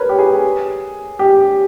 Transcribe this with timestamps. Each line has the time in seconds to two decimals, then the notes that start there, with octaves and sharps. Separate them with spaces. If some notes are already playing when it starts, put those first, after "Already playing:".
Already playing: A#4 B4 C#5
0.09 G4
0.19 G#4
1.19 G4